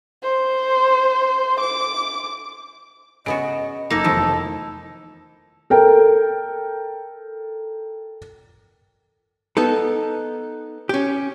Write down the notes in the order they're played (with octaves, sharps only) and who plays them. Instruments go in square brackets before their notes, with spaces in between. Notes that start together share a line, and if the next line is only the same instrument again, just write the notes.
[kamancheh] C5
D6
[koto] C#3 B3 F#4 [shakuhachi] D#5 [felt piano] D7
[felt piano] F#1 D6 [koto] A#3 [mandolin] D#4 A4
[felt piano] F1 E2 E6 [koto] D#3 F3 E4 [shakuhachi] A5
[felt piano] A4 A#4 G5
[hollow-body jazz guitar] B3 D#4 A4
C#4 G4